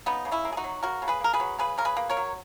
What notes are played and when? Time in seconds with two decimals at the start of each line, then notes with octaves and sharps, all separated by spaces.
0.06 C#3 B3 D#4
0.25 C#3
0.32 C#4 E4
0.45 A#3
0.52 G#4
0.57 D#4 F#4
0.64 F#3
0.82 C#3 F#4 A#4
1.02 C#3
1.08 G#4 B4
1.21 A#3 A#4
1.34 G#4 B4
1.40 F#3
1.58 C#3 G#4 B4
1.78 C#3 A#4
1.85 G#4 B4
1.97 A#3
2.10 A#4 C#5
2.17 F#3